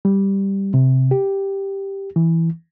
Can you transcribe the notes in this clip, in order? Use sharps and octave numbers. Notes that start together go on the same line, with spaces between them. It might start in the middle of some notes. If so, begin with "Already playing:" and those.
G3
C3
G4
E3